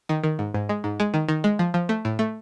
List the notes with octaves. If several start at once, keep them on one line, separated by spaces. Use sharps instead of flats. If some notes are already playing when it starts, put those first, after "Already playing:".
D#3
D#3
G#2
G#2
G#3
G#2
G#3
D#3
D#3
G#3
F3
F3
A3
A2
A3